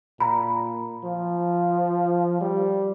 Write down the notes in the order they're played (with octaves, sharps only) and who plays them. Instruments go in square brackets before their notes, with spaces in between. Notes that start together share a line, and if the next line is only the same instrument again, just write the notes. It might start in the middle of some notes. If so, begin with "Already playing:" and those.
[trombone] A#2 [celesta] A#5 B5
[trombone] F3
G3